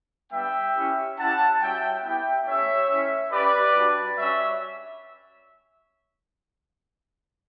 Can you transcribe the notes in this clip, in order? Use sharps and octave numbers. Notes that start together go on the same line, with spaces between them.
G3 B3 D4 E5 G5
C#4 E4 G4
C#4 E4 G4 F#5 A5
G3 C#4 F#4 E5 G5
B3 E4 G4 E5 G5
A3 C#4 G4 C#5 E5
A3 C#4 E4
C#4 G4 B4 D5
G3 D4 F#4
G3 C#4 F#4 C#5 E5